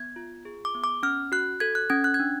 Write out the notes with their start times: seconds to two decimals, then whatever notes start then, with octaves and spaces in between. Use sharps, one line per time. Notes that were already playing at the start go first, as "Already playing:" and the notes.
Already playing: B3 G#6
0.16 F4
0.45 G#4
0.65 D6
0.74 B3
0.84 D6
1.03 C#4 F6
1.32 F#4 F#6
1.60 A4 G#6
1.75 F#6
1.90 C#4 G#6
2.04 F#6
2.14 G#6
2.20 D4